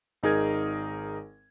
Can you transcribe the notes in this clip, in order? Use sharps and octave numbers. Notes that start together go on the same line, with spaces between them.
G#1 D#4 G#4 A#4 G#6